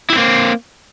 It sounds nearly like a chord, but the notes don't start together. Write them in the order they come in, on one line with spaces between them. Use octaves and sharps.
E4 G4 C4 A#3